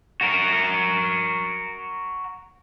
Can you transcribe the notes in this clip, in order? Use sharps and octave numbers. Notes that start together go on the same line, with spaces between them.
F#4 A#4